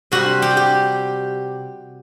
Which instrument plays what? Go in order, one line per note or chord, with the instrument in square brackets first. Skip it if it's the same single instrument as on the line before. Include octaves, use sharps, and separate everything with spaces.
[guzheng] C3 G3 F#4
G4
G4